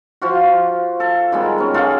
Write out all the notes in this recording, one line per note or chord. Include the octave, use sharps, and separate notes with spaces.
F3 F4 F#4
A4
D#3 G3 G#3 B3
C#4 A#4
F4 G#4 A4 F#5